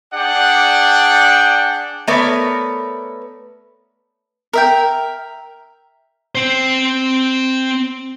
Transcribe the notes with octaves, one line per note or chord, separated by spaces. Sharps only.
D4 G#4 D5 F#5 G5
A3 B3 A#4 B4 C#5 D5
A#4 E5 G5
C4 C5